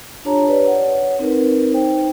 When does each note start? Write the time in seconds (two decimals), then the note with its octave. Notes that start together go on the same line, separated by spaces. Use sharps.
0.25 D4 F4 G4 C#5 A5 A#5
0.47 G4 B4 C#5 D5
0.65 C#5 F#5
1.19 C4 D#4 A#4 B4
1.70 D#4 C5 G5